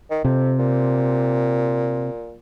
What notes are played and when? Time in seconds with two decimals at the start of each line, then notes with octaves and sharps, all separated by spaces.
0.11 D#3
0.24 F2 C3
0.59 A#2